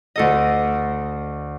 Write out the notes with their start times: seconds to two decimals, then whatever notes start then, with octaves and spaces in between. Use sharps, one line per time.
0.16 D2 A4 D#5